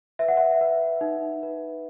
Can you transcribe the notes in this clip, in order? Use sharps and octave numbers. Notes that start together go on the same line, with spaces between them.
B4 E5
F#5
E5
B4
D#4
B4